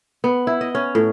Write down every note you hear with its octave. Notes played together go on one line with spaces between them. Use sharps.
B3
E4
D#5
C#4
A2